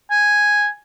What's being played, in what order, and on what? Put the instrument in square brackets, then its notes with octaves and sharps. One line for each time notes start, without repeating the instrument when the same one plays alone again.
[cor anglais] G#5